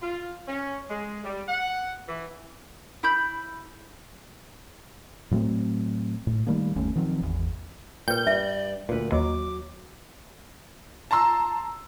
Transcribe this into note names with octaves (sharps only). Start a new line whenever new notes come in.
F4
C#4
G#3
G3
F#5
E3
E4 B5 G6
A2 F#3 A3 C4
A2
D#3 G3 A3 A#3
G1 D#2 A3 C#4
D#3 F3 F#3 C4
G#1 E2
A#2 B4 G5 G6
G2 D5 E5
D2 A#2 B4
D#2 F#3 D6
A5 A#5 C6 E6